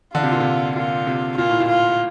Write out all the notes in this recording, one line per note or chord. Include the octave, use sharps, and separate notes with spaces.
D3 F4
C3
A#2
C3
A#2 F4
C3
A#2 F4
A2
A#2
F4